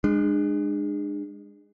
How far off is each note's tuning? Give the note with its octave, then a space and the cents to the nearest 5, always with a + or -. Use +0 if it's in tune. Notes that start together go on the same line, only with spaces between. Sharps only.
G#3 -20 D4 +30